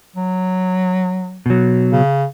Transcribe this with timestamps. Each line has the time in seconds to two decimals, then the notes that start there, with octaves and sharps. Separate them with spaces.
0.16 F#3
1.46 B2 F#3
1.92 C#3